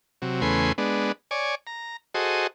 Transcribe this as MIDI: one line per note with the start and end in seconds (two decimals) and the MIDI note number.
0.22 0.41 48
0.22 0.41 54
0.42 0.72 40
0.42 0.72 49
0.42 0.72 57
0.42 0.72 71
0.42 0.72 80
0.42 0.72 84
0.78 1.12 56
0.78 1.12 59
0.78 1.12 62
1.31 1.55 73
1.31 1.55 74
1.31 1.55 80
1.67 1.97 82
2.14 2.47 66
2.14 2.47 68
2.14 2.47 69
2.14 2.47 72
2.14 2.47 75